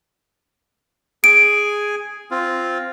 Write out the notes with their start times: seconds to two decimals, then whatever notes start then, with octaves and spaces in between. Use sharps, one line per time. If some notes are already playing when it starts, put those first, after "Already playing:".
1.24 G#4 G#5 D7
2.31 C4 F4